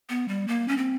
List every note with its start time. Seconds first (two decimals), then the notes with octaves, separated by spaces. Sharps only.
0.09 B3
0.28 G3
0.48 A#3
0.68 C#4
0.77 C4